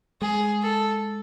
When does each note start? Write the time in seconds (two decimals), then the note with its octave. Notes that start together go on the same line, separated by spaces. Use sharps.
0.21 G#3 G#4
0.63 A4